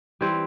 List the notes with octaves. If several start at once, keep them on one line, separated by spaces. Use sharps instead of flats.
E3 G3 C4